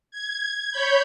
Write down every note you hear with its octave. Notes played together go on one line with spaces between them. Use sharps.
G#6
C#5 B5 G6